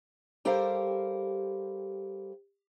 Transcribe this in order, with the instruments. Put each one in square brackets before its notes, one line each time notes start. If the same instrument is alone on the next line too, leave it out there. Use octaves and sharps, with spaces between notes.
[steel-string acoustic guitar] G3 G4 A4 A#4 C5 F5